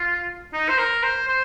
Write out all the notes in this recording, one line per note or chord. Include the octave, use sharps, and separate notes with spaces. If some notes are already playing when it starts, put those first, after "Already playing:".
Already playing: F4
D#4
C5
A#4
C5
C5